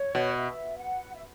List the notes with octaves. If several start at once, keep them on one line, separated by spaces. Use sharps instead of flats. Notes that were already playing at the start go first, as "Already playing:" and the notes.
Already playing: C#5
B2
E5
F#5
E5